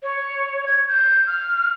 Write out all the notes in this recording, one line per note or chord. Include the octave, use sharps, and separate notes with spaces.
C#5
G#6
G6
F6